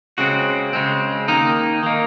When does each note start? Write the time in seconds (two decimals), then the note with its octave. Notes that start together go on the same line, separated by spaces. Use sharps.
0.18 C#3 G#3 C4 F#4
0.73 C#3 G#3 C4
1.28 D#3 A#3 D#4
1.83 D#3 A#3